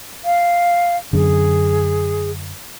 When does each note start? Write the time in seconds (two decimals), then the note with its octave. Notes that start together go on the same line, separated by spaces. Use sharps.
0.25 F5
1.13 F#2 D3 G#4